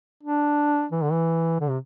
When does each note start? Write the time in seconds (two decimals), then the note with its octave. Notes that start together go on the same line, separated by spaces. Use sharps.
0.23 D4
0.92 E3
1.02 D3
1.12 E3
1.60 D3
1.69 C3